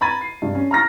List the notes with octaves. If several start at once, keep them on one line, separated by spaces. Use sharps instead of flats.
A#5 B5 G#6 A6 D#7
C7
G2
C#4
A#5 F6 A#6